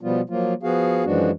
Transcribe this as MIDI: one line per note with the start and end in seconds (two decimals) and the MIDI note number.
0.01 0.21 47
0.01 0.21 53
0.01 0.21 55
0.01 0.21 59
0.01 0.21 65
0.30 0.54 53
0.30 0.54 54
0.30 0.54 58
0.30 0.54 65
0.63 1.05 53
0.63 1.05 59
0.63 1.05 66
0.63 1.05 68
0.63 1.05 77
1.05 1.31 42
1.05 1.31 52
1.05 1.31 53
1.05 1.31 56
1.05 1.31 62
1.05 1.31 66